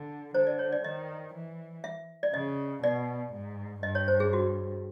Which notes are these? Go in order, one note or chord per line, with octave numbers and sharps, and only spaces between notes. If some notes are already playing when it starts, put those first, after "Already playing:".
Already playing: D3
D3 C5
D5
C#5
D5
D#3 D#5
E3
E5
D5
C#3 D#5
B2 D5
G#2
G2 D#5
C#5
C5
G#4
F#4